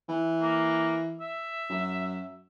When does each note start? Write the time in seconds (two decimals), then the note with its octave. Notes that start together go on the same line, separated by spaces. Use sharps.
0.09 E3
0.41 A#3
1.21 E5
1.70 F#2